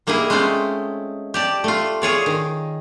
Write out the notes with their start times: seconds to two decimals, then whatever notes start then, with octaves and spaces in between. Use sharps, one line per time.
0.07 G3 A#3 D#4 E4 G#4
0.30 G#3 A3 C4 C#4 F4
1.34 G4 D5 A5
1.64 A3 F4
2.02 F4 G#4 C#5 D5
2.26 D#3